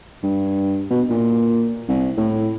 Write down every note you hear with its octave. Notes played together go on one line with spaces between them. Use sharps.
G2
B2
A#2
C2
A2